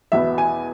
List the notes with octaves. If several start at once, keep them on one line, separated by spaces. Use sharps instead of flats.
E2 B2 B3 E5
G#5